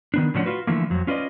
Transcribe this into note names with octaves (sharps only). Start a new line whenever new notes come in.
D#3 B3 D4
A2 D3 F3 C#4 D4 F#5
F4 F#4 B4
D3 E3 F3 A3 A#3
F2 F#3
C#4 F4 B4 D5 D#5